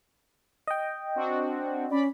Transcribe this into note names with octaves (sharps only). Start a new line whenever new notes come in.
D#5 G5
C4 D4 F#4
C#4 D5 B5